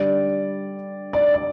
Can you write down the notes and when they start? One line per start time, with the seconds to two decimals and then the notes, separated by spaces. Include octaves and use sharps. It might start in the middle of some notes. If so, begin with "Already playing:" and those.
Already playing: D3 G3 D5
1.13 D5
1.34 D5